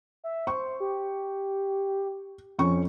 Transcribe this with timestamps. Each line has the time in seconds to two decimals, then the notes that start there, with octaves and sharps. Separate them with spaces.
0.24 E5
0.47 C5 C#6
0.80 G4
2.59 F2 C#4 C#6